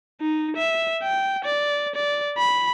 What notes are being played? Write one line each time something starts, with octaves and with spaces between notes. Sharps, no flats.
D#4
E5
G5
D5
D5
B5